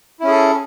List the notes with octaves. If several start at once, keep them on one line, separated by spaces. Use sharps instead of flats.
C#4 E4 G#4 A4